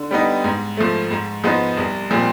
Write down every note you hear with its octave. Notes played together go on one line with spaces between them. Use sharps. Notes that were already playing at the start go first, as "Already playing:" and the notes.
Already playing: D3
G3 B3 D#4
G#2
F3 A3
G#2
F3 G#3 B3 D#4
C2
A#2 F3 G#3 C4